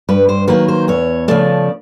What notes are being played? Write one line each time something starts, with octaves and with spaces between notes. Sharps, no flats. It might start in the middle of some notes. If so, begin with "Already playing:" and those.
G2 B4
C5
D#3 F#3 A#3 B4
C5
E2 C#5
C#3 F3 A3 D5